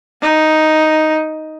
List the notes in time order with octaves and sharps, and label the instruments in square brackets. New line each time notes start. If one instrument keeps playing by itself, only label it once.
[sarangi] D#4